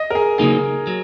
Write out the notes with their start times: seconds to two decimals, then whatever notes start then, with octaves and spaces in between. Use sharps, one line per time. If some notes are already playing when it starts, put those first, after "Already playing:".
Already playing: D#5
0.10 A#4
0.15 G#4
0.38 C#3 F#3 A#3 D#4 G#4
0.87 F#3